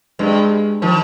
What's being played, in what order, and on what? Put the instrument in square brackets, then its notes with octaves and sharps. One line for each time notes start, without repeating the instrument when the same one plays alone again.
[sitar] G2 [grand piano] G#3
[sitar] D#3 [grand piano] F3